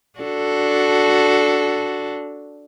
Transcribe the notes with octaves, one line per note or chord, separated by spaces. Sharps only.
D4 F#4 A4